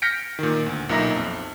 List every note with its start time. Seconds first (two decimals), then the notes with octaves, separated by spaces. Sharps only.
0.02 F6 G6 A#6 B6 C#7 D7
0.39 A#2 D#3
0.66 D2
0.89 B1 A#2 D#4 E5 A#5 A#6
1.16 F2